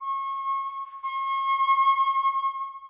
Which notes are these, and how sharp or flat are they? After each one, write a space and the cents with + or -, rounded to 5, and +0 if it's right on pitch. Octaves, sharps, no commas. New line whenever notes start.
C#6 -30
C#6 -40